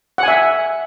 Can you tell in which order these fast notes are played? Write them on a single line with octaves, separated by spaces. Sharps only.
F#5 G#5 E5